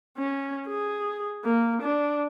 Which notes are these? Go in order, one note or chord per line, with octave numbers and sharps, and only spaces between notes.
C#4
G#4
A#3
D4